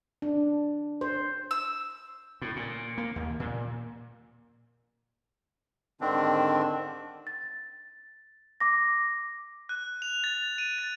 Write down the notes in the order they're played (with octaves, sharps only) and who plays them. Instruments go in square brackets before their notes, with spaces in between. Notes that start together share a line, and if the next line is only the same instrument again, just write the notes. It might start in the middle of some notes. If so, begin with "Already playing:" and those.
[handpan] D4
C5
[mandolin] E6
[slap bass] A2
A#2
A#3
D#2
A#2
[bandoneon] G#2 D3 D#3 C4 D4
[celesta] A6
D6 A#6
[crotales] F#6
F7
A6
D#7
A6